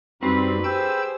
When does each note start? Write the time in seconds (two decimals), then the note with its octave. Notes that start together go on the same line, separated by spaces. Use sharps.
0.22 F#2 G3 C4 D#4 F#4 B4
0.64 G4 G#4 C5 G5 E6 G6